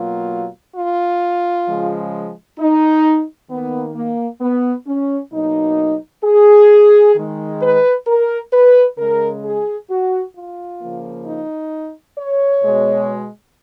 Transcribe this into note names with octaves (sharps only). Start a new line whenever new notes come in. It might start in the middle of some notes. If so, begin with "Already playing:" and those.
Already playing: B2 F#3 A#3 F4
F4
C#3 F3 G#3
D#4
D#3 A#3 B3
A#3
B3
C#4
B2 F#3 A#3 D#4
G#4
D#3 G#3
B4
A#4
B4
C#3 G#3 A#4
G#4
F#4
F4
C#3 F3 A#3
D#4
C#5
B2 G#3